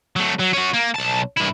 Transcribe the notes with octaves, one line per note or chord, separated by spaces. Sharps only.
F#3 A3
F#3
C#4 F#4
A#3
B1 A5
G2 E4